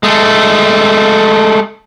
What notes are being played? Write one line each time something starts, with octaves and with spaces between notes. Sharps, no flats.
G#3 A3